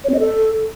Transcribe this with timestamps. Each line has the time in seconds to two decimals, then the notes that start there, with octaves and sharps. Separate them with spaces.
0.04 C#5
0.09 C4
0.14 D#5
0.19 A4